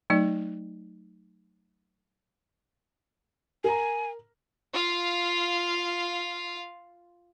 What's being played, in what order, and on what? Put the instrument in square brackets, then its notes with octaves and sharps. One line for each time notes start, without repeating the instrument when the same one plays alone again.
[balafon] F#3 A3 D#4 D5
[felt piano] A#4 A#5 [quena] G#5
[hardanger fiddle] F4 F5